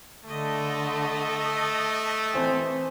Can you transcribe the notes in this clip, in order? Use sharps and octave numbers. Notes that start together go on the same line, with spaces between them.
D3 A3 D#5 A5
E3 C4 C5 G#5